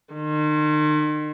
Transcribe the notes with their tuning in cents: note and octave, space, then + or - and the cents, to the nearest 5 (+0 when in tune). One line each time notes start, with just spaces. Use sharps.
D#3 -40